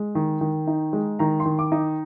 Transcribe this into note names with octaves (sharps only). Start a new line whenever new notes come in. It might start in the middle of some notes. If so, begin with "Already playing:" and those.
Already playing: G#3
D#3
D#3
D#4
G#3
D#3 A#5
C6
D#3
D6
D#4